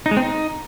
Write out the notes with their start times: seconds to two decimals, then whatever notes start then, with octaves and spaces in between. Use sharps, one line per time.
0.06 D#4
0.11 G#3
0.17 C4
0.22 D#4